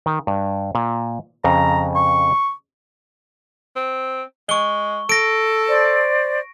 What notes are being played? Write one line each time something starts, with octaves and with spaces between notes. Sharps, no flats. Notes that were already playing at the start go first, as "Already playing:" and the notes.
D#3
G2
A#2
F2 C#3 A#5
C#6
C4
G#3 C#6 G7
A4 A#6 D7
C5 D5